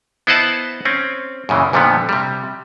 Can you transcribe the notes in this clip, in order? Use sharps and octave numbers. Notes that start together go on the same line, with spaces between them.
B3 E4 C5 D#5 F#5 A5
C4 C#4
F#2 A#2 C#3 E3
F2 A#2 D3 F3 G3 B3
C3 G3